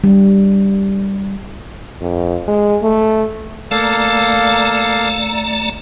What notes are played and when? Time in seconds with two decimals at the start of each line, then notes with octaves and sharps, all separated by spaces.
0.04 G3
2.01 F2
2.47 G#3
2.83 A3
3.71 A3 A#3 A4 D5 F5 A#5